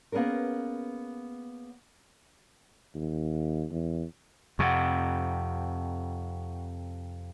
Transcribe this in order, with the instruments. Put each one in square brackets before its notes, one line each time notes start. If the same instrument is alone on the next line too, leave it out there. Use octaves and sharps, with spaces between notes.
[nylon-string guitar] A#3 B3 C#4 G#4 A#4
[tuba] D#2
E2
[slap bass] F2 C3 [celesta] F#5 C#6